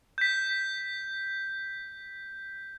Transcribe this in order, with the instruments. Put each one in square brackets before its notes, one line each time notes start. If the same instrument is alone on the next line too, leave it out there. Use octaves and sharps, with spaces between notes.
[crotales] G6 B6